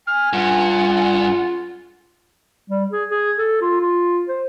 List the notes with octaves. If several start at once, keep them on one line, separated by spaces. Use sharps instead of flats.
G#5 F6
G2 F4 F#5
G3
G#4
G#4
A4
F4
F4
C5